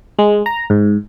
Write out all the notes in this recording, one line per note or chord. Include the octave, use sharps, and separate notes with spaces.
G#3
A#5
G#2